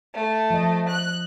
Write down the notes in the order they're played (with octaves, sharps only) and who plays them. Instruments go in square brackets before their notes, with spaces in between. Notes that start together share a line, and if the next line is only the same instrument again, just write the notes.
[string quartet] A3
[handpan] F3 D#5
[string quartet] F#6